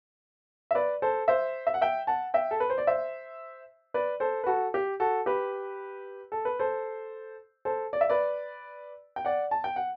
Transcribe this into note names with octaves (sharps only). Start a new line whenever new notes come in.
E5
B4 D5
A4 C5
C5 E5
E5
F#5
E5 G5
F#5 A5
E5 G5
A4
B4
C5
D5
C5 E5
B4 D5
A4 C5
B4
F#4 A4
G4
F#4 A4
G4 B4
A4
B4
A4 C5
A4 C5
D5
E5
B4 D5
G5
D5 F#5
A5
G5
F#5